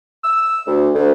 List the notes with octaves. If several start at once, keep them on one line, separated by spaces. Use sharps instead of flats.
E6
D2
D2